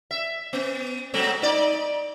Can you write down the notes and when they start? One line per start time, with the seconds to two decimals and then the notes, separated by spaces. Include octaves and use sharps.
0.11 E5
0.53 B3
1.14 F#3 G#3 C4
1.42 D#4 D5